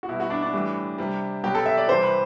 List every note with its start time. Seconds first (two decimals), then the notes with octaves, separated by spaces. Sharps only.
0.03 F#4
0.09 B2 G3 E4
0.20 F#4
0.30 D4
0.42 D4
0.53 A2 E3 G3
0.98 C3 G3
1.44 B2 F#3 G4
1.55 A4
1.66 E5
1.78 D5
1.88 C3 E3 G3 C5
2.03 B4